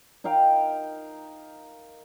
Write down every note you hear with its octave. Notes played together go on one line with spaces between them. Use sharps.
D#4 A#4 F5 G5